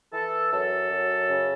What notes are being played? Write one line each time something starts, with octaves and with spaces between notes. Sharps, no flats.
E3 A4
F#2 A4
F#2
C#3